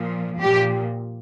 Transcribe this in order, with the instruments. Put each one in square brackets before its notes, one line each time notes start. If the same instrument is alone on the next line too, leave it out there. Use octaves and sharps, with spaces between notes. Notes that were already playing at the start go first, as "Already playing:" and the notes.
Already playing: [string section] A#2 F3
A#2 F3 G4